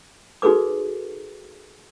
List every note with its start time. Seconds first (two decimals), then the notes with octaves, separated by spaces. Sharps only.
0.42 D#4 F#4 G#4 A4 B4 D6